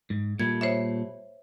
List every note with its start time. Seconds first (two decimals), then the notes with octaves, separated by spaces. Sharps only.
0.10 G#2
0.40 A#2 G3 A3 G#6
0.61 C5 C#5 E5